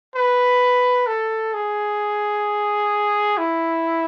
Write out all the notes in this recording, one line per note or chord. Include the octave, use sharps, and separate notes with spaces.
B4
A4
G#4
E4